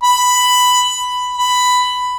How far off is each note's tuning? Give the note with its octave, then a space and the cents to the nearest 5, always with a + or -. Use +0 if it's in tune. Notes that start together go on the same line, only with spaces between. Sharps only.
B5 +10
B5 +10